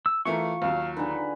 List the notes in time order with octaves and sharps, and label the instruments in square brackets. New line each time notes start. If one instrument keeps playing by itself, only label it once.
[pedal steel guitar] E6
[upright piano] E3 A3 A#4 [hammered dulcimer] F4 [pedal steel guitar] C#6
[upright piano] D#2 F#3 [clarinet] F5
[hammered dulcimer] D3 G#4 B4 [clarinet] D#4